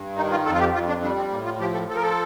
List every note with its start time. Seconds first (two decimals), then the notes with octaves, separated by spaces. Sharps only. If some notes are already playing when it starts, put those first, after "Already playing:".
Already playing: G2
0.16 D#3 D#4
0.31 F4
0.46 F2 A4
0.53 F4
0.60 G4
0.74 F2 F4
0.88 D4
1.02 G3 D4
1.17 C4
1.31 A2 A#3
1.45 F4
1.60 F3 G4
1.74 A4
1.88 F3 A4
1.96 A#4
2.02 A4